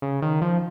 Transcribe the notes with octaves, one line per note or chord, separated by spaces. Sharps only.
C#3
D#3
F3